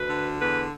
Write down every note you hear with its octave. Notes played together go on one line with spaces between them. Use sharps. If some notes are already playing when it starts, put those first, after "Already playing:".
Already playing: D2 B4
D3
E2 B4